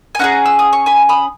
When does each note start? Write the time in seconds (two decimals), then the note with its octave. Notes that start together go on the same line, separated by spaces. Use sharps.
0.15 G#5
0.19 C#4 E4 G#4 F#5 A#5
0.46 E6
0.59 D#6
0.73 C#6
0.86 G#5 B5
1.09 B5 D#6